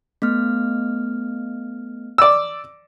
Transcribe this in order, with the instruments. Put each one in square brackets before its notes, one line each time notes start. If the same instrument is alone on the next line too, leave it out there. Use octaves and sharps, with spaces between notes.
[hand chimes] A3 B3 F6
[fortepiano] D5 E6